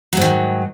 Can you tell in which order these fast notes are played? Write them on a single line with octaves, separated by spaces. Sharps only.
F#3 G#2 D#3